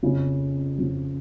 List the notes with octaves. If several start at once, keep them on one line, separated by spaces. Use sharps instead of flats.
F2 C#3 F3
F2 C#3 F3